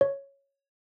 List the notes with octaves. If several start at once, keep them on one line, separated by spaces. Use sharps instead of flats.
C#5